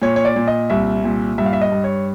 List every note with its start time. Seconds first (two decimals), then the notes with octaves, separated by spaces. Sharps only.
0.02 A#2 C#5
0.16 C#5
0.25 D5
0.36 A#2
0.47 D#5
0.70 C2 E5
1.04 A#2
1.38 G2 E5
1.46 F5
1.53 E5
1.61 D#5
1.72 G2
1.84 C#5